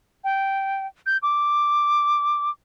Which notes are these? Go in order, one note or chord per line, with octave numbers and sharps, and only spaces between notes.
G5
G6
D6